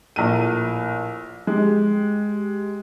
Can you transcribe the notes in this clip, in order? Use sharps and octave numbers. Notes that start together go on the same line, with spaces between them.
A#1 A2 D#7
G#3 G4